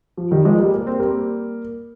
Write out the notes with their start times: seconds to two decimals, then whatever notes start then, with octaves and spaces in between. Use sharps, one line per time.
0.17 F3
0.31 D#3 G3
0.45 F3 G#3
0.59 G3 A#3
0.74 A#3
0.87 C4
0.99 G3 A#3